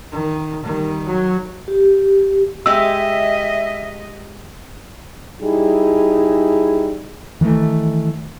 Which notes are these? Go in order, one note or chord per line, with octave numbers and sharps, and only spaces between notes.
D#3
D#3 G3
F#3
G4
G#3 G4 D#5 E5 E6
G3 D#4 E4 G#4
D#3 E3 G#3 A3